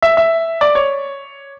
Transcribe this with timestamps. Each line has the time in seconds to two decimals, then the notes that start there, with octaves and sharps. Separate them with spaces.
0.02 E5
0.17 E5
0.61 D5
0.75 C#5